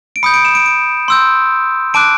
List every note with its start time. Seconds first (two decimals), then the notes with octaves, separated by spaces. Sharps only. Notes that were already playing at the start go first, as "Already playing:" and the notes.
0.16 D7
0.23 B5 D#6 G6 C#7
0.34 D7
0.45 E7
0.55 D7
0.66 D7
1.08 C6 E6 G6
1.94 A5 D6 F#6 D7